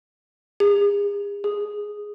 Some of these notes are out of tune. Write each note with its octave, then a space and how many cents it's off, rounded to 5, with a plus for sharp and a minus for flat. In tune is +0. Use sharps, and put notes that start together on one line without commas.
G#4 -40
G#4 +0